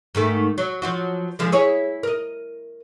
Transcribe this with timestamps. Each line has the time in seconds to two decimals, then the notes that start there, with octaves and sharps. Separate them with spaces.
0.15 G#2 D#3 A3
0.58 F#3
0.82 F3 F#3 F#4
1.39 D3 F3 G#3
1.52 E4 G#4 C#5
2.03 A#4 D#5